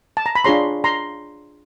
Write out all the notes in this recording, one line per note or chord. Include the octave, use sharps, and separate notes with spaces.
A5
A#5
B5
D4 F4 G#4 C#5 A#5 C6
A#5 C6